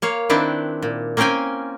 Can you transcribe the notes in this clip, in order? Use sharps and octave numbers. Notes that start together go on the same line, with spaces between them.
A#3 C#5 F5
D#3 C4 D4 E4 B4
A#2
A#3 C4 C#4 A#4 G5 G#5